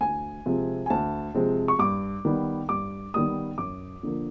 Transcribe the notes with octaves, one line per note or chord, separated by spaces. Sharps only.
D2 G#5
C3 F3 G#3 C4
G#5
D2 A5
C3 F3 G#3 C4
C#6
G2 D6
D#3 G3 B3
G2 D6
D#3 G3 B3 D#6
F#2 D6
D3 F3 A#3